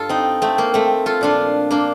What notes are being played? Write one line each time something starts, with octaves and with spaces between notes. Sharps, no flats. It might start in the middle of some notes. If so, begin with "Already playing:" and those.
Already playing: G2 F4 A4
C4 D#4
A3 C4
A#3
A3 C4
F4 A4
A#2 F3 D4 F4
A#3 D4